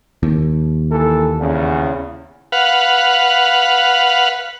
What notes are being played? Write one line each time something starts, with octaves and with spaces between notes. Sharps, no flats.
D#2
E3 A#3 A4
E2 C#3
B4 F5 F#5